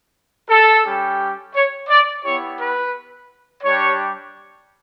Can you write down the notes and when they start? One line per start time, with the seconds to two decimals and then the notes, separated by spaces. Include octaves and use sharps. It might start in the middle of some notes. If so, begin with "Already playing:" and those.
0.49 A4
0.84 G3 C#4 G4
1.54 C#5
1.88 D5
2.23 B3 E4 G4 C#5
2.59 B4
3.63 G3 D4 G4 C#5